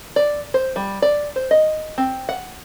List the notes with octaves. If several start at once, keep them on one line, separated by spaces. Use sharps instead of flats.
D5
C5
G3
D5
C5
D#5
C4
F#5